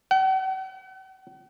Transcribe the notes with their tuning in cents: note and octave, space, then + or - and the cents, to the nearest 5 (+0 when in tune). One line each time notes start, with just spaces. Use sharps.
F#5 +45